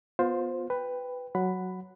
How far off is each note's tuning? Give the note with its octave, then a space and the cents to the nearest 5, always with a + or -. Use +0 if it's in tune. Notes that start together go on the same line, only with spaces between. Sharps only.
B3 +0 F4 +25 C5 +0
B4 +10 G5 +10
F#3 +0 F#5 +0 B5 +10